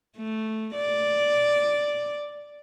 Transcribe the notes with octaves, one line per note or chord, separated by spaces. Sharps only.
A3
D5